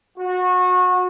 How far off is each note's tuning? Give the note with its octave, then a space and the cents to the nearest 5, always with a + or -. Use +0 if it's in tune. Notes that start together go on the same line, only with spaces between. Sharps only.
F#4 -25